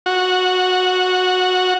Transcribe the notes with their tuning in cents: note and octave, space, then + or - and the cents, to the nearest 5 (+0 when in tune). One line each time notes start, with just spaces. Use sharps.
F#4 -10